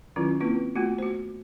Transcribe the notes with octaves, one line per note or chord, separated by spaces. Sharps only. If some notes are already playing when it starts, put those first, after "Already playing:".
D#3 F#3 C#4 E4 F4
A#3 C4 E4 F4 B4
A3 B3 F4 F#4
F#4 C5